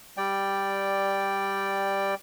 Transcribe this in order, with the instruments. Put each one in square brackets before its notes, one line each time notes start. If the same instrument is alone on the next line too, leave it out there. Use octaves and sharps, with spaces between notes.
[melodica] G3 D5 G5